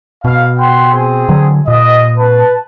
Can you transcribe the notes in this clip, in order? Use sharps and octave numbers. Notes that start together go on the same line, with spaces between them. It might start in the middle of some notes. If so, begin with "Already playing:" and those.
B2 F5
F#5 G5 C6
C4 G#4
D3 F#3
A#2 D#5
B4 A5